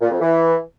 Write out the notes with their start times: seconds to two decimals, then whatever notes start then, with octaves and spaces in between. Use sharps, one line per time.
0.01 A#2
0.11 F2
0.20 E3